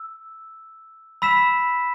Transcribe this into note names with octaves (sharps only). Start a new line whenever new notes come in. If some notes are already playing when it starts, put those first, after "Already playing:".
Already playing: E6
B5 E6 B6 E7